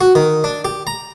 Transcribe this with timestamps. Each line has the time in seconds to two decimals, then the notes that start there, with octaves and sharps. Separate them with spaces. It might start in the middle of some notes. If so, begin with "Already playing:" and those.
0.01 F#4
0.15 D#3
0.44 D4
0.65 G4
0.87 A#5